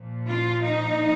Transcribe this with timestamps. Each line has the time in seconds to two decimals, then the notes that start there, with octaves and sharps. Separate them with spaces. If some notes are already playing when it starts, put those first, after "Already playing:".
Already playing: A#2 F3
0.28 F4
0.63 D#4